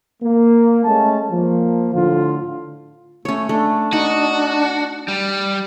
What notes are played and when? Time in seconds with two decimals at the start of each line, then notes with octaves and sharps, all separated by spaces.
0.22 A#3
0.85 G#3 A3 C#4 A5
1.31 F3 A#3
1.95 A2 D3 F4
3.25 A3 C#4 C#5
3.49 A3 D4
3.93 D#4 F#4
5.08 G3